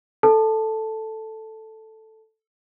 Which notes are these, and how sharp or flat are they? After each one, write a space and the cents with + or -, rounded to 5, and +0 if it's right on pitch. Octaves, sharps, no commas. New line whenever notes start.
A4 +0 A5 +0